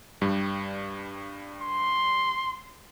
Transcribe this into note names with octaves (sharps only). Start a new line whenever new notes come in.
G2 G3
C6